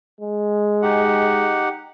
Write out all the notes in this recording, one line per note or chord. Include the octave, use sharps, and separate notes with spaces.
G#3
D#4 G4 F#5